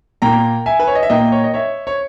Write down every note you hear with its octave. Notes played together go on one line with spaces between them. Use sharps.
A#2 A#3 G5 A#5
E5 G#5
B4
C#5
D#5
E5
A#2 A#3 D#5 G5
C#5
D#5
C#5 E5
C#5